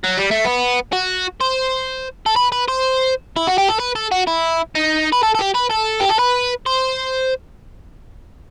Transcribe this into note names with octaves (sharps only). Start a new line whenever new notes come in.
F#3
G3
A3
B3
F#4
C5
A4
B4
B4
C5
E4
F#4
G4
A4
B4
A4
F#4
E4
D#4
B4
A4
A4
G4
B4
A4
G4
A4
B4
C5